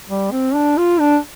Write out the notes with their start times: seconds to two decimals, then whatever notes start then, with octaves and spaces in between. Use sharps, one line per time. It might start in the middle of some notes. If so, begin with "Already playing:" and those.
0.10 G3
0.32 C4
0.55 D4
0.77 F4
1.00 D4